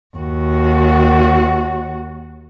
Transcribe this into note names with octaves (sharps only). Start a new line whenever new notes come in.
D#2 F#4